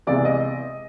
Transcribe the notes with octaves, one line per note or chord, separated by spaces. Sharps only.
C#2 C3 E3 G#3 B3 D5
D#5